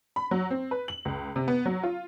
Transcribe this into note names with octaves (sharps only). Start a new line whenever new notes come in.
B5
F#3
C4
B4
F#7
C#2
C3
B3
F#3
F4